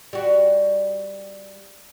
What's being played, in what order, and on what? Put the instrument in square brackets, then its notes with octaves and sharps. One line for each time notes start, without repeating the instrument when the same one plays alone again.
[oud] G3 F#4